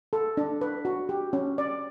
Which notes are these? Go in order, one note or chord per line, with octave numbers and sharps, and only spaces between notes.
A4
D4
B4
F#4
G4
C#4
D5